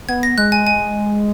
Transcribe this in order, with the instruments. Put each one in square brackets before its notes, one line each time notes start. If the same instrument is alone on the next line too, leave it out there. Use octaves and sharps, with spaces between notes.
[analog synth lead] B3 [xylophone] G#6
[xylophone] A#6
[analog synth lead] G#3 [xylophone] F#6
[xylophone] G#5
G#5